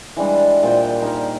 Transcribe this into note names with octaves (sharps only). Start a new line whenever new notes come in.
E3 G3 G#3 D4
A#2 C5 G5
D#4 A#4